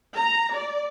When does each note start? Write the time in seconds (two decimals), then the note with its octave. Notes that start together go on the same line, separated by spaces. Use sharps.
0.15 A#5
0.54 D5